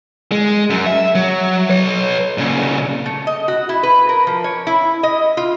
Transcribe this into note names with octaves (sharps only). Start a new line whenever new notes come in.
G#3
F#2
E5
F#3
B4 C#5
A#2 C#3
A3
D#5
F#4
E4
B4
A#4
F3
C#5
E4
D#5
F4